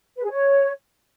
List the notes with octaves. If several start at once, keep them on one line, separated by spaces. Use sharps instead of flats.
B4
G#4
C#5